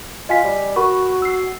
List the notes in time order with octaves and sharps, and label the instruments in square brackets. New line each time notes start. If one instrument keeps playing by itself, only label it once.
[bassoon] F4 [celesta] D#5 G#5 B6
[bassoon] G3
[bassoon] F#4 [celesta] A#4 B5 C#6
[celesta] E6 C7